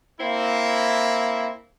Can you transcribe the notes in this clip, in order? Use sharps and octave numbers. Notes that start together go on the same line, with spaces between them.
A#3 C4 E4